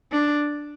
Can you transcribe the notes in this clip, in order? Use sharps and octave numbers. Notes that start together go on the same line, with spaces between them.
D4